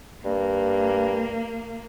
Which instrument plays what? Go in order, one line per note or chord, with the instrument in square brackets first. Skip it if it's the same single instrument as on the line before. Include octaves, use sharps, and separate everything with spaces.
[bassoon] G2 [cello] A#3